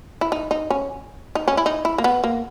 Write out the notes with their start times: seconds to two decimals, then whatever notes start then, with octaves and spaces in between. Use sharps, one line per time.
0.21 E4
0.32 D#4
0.51 D#4
0.70 C#4
1.35 D#4
1.48 C#4
1.57 E4
1.66 D#4
1.85 E4
1.98 A#3
2.04 B3
2.24 A#3